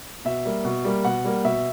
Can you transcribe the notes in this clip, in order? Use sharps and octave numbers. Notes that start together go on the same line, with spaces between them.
B2 E5
G3 A#3
B2
G3 A#3
B2 F#5
G3 A#3
B2 E5